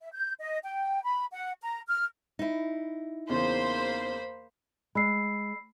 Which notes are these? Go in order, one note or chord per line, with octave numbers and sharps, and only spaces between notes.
E5
G6
D#5
G5
B5
F#5
A#5
F6
D#4 E4
E2 C#3 A#3 C5 B5
G#3 B5 E6 C7